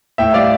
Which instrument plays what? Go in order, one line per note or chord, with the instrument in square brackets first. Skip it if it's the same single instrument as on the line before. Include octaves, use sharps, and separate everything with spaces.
[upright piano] A2 E5 G5
G3 D5 F5